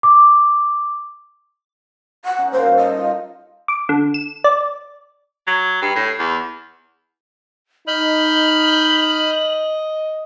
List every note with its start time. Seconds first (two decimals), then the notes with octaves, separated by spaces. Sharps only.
0.03 D6
2.25 F#5
2.38 C#4 D#4
2.52 A#3 F#4 C5 F5
2.64 G2
2.77 A4 C5 D#5
2.95 F4
3.68 D6
3.89 D3
4.14 E7
4.44 D5
5.47 F#3
5.82 G2
5.96 A2
6.19 E2
7.88 D#4 D#5 B5 F6 G6 F#7